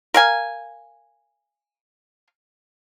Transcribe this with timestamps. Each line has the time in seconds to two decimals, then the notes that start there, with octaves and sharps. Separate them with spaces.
0.14 A#4 F5 G#5